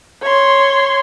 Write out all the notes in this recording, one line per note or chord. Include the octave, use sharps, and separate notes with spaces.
C#5 C6